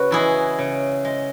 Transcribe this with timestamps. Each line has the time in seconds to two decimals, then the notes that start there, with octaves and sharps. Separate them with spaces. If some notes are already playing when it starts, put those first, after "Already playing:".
Already playing: C#3 F#4 B4
0.11 E3 G#3 E4 G#4
0.59 C#3
1.05 G#3